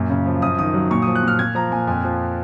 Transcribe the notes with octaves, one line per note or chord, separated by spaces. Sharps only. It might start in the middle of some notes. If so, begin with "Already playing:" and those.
Already playing: F#2 A#2
C#3
F3
F#2 D#6
D#3 D#6
F#3
A#2 C#6
F3 D#6
F#6
A#2 F6
A#2 G#6
F3 A#5
A#2 G#5
F2 G#5
F3